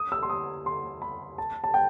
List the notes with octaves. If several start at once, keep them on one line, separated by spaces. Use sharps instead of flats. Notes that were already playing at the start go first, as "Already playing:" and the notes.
Already playing: D#6
E6
C6
D#6
C6
B5
A5
A5
G5